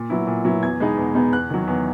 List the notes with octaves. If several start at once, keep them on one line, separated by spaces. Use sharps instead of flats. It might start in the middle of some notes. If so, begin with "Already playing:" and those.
Already playing: A#2
F#3 B3 E4
A#2
F#3 B3 E4
E2 G#6
B2 G#3 B3 D#4
E2
B2 G#3 B3 D#4
E2 F#6
D#3 F#3
E2